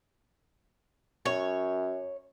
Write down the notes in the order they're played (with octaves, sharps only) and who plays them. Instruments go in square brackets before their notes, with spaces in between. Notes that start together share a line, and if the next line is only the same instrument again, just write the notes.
[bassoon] F#2 [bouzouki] C#5